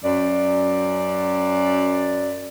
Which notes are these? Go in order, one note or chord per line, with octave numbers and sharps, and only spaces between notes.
F#2 D5